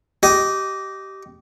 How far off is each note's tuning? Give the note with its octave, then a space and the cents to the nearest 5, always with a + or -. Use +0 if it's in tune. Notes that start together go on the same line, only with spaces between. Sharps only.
G4 -20 D#5 +0